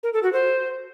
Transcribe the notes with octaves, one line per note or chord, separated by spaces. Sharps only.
A#4
A4
F#4
C5